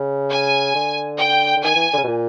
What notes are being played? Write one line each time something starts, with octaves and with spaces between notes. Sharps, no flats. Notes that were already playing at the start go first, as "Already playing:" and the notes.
Already playing: C#3
G#5
D3
G5
D3
D#3 G#5
E3
D3
C#3
B2
A#2